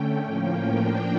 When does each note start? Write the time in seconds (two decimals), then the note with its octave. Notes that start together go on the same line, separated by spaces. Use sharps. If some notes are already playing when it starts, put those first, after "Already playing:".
Already playing: D3 A3 C#4 G5
0.25 A2 F3 A#3 C#4 G5
0.78 A2 F3 A#3 D4